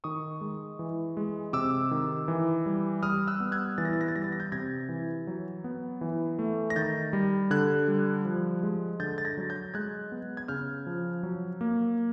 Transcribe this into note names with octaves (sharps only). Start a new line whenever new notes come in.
D#3 C#6 D#6
G#3
E3
G#3
C3 D6 E6
D#3
E3
G3
G3 D#6 F6
E6 F#6
B3
F#6 G#6
E3 A6
A#6
A6
A#6
A6
G3 A#6
A6
A#6
G6 A6
C3 G#6 A#6
E3
F#3
B3
E3
A3
A#6
D#3 G6 A6
G3
D3 F#6 G#6
G3
F3
G#3
D3 G6 A6
A6
G#6 A#6
F#3
G6 A6
G#3 F#6 G#6
B3
G#6
C#3 F6 G6
F3
F#3
A#3